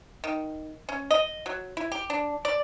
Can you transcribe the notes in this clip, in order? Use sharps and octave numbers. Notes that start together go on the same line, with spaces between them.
D#3
C#4
D#5
F#3
E4
G4
D4
D5